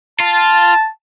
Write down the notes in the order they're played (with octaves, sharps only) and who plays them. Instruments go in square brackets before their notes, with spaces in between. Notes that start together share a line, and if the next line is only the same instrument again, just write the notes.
[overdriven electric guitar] F4 [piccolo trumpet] A5